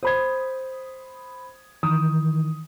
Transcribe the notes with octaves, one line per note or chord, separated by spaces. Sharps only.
C5 B5 D#6 G#6
D#3 E3 D#6